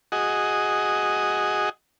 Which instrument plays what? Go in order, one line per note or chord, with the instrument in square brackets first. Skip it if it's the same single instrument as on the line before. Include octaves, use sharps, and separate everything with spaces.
[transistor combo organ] F#4 G#4 D#5